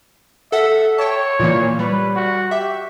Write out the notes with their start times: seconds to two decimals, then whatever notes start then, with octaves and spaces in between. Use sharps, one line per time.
0.52 A4 E5 F#5
0.98 C#5 G5 A5
1.40 A#2 E3 A#3
1.79 G3 B4
2.16 F#4
2.51 G4 E5